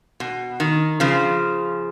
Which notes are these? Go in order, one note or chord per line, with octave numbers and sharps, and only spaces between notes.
B2
D#3
C#3 F3